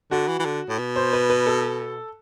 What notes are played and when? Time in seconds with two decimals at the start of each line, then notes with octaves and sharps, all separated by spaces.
0.11 D3 F#4
0.28 E3
0.39 E3
0.45 D3
0.69 A2
0.79 B2
0.96 C5
1.13 B4
1.30 B4
1.46 A4